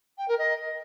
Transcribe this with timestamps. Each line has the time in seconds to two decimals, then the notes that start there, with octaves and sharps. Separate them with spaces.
0.18 G5
0.28 A#4
0.39 D#5